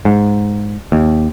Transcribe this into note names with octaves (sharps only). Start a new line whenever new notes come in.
G#2
D#2